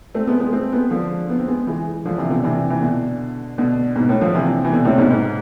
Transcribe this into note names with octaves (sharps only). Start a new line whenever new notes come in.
A3 C4
G#3 B3
G#3 B3
A3 C4
G#3 B3
D3 F3
B3
C4
G#3 B3
E3 G#3
D3 F3
C3 E3
B2 D3
C3 E3
E3
B2 D3
B2 D3
G#2 B2
A2
D3 F3
C3 E3
E3
B2 D3
A2 C3
G#2 B2
G#2